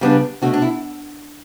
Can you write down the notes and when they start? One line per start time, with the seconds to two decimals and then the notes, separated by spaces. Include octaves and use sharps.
0.01 C#3 G3 B3 D4
0.42 B2 A3 D4 F#4
0.54 D4
0.62 E4